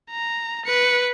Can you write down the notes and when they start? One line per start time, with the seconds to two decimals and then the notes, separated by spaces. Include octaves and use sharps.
0.10 A#5
0.66 B4 C#7